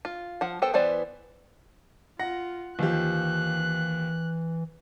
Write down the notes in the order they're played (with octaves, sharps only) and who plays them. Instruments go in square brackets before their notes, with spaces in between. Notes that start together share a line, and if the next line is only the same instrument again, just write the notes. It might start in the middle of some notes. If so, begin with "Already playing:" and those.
[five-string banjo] F4
F3 F#5
B3 A4 C5 G5
E3 B3 C5 D5
[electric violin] F4 [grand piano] F#5 A#6
[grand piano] D#2 F3 G4 [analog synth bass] E3 [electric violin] F#6